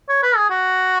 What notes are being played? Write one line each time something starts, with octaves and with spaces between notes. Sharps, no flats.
C#5
B4
G#4
F#4